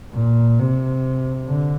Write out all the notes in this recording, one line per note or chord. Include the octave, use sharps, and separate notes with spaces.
A#2
C3
D3